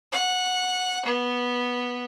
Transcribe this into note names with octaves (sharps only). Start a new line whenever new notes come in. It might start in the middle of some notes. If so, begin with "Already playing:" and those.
F#5
B3